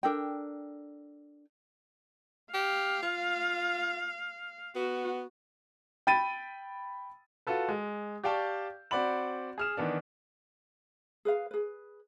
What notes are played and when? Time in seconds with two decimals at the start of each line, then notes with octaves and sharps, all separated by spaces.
0.03 D4 A4 A#4 G5
2.54 G4 F5
3.03 F4
4.76 B3 F#4
6.07 G5 B5 A6 D#7
7.47 F4 F#4 A4 B4
7.69 G#3
8.24 G4 D5 F5 G5 A5 C#6
8.91 C4 F#4 D5 F#5 B5 F#7
9.58 G#4 F6 E7
9.77 D#3 E3 B3 D4
11.25 G#4 B4 F5
11.51 G#4 B4